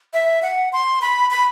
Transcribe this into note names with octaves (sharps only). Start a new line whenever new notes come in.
E5
F#5
C6
B5
B5